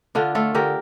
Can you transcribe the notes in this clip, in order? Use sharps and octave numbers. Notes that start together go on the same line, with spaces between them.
D3 D4 F4
A3 F4 A4
D3 G4 A#4